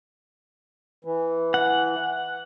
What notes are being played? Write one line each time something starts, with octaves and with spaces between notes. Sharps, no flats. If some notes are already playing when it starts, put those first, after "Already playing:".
E3
F#5